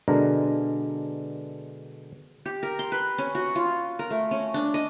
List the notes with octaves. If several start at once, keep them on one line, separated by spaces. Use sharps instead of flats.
B2 D3 G#3 D4 A#4 A#5
G4
A#4
C6
B4
C#4
F#4
F4
A#4
A3
C#4
D4
D#5